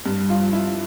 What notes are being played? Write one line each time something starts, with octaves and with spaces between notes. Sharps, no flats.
G2
F4
F3
E4